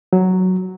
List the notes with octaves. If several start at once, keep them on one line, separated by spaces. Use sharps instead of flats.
F#3